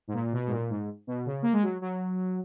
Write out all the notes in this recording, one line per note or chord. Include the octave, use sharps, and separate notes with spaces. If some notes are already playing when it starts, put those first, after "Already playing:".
G#2
A#2
B2
G#2
A#2
G#2
B2
C#3
A#3
G#3
F#3
F#3